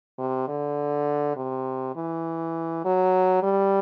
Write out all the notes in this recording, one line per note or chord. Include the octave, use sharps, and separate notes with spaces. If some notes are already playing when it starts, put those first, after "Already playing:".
C3
D3
C3
E3
F#3
G3